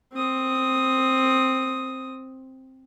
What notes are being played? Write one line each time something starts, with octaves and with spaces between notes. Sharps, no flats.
C4 D#6